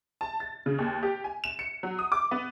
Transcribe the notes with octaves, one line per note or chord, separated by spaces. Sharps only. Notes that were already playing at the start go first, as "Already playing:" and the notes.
A5
A6
C#3
D#2
G4
G#5
E7
C#7
F#3
D#6
D6
B3